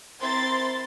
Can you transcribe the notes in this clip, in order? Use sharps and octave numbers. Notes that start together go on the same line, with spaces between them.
C4 E4 A#4 C6 A6